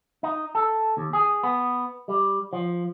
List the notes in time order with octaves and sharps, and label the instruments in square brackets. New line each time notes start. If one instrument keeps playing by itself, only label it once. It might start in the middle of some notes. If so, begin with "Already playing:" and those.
[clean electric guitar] D#4
A4
D#2
G#4
B3
G3
F3